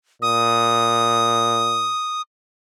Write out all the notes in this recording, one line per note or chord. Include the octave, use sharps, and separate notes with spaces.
A#2 D#6